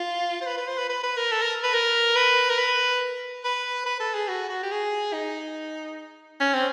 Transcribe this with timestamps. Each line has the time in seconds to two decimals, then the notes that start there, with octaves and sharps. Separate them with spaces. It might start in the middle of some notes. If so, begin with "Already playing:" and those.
Already playing: F4
0.41 C5
0.46 B4
0.57 B4
0.68 C5
0.78 B4
0.89 B4
1.03 B4
1.17 A#4
1.31 A4
1.41 A#4
1.63 B4
1.74 A#4
2.16 B4
2.49 A#4
2.58 B4
3.44 B4
3.86 B4
4.00 A4
4.14 G#4
4.28 F#4
4.49 F#4
4.63 G4
4.71 G#4
5.13 D#4
6.40 C#4
6.53 C4